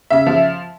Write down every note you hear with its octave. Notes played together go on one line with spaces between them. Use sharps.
C#3 E5
F3